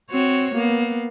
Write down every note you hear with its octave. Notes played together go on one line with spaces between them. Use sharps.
C4 F#4 C#5
A#3 B3